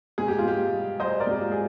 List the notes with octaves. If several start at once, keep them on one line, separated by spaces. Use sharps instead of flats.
G#2 G#4
G4
F4
G#2 G4
G3
G3 C5 D#5
A#4 D5
G#2 G4
F4
G#4